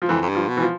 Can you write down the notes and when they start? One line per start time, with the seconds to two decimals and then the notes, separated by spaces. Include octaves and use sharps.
0.02 F3
0.08 F2 E3
0.22 F2
0.28 G2
0.35 F3
0.48 B2
0.57 E3
0.62 F3